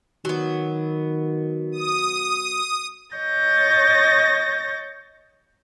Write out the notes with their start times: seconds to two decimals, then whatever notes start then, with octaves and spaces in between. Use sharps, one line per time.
0.25 D#3 F#3 B3
1.72 D#6
3.15 C#5 D#5 G6 A6 A#6